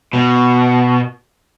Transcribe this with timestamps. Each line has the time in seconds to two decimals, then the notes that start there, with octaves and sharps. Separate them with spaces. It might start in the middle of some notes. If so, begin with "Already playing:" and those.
0.13 B2